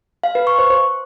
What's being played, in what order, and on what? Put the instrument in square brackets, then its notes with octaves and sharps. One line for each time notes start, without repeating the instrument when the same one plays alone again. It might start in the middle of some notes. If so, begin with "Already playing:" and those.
[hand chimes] F5
B4
C#6
C5
C5